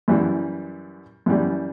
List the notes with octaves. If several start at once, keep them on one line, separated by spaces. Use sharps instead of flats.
F#2 E3 G3
F#2 E3 G3